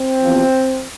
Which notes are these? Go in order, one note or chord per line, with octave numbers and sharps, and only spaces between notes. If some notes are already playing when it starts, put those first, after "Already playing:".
Already playing: C4
E2 C3 F3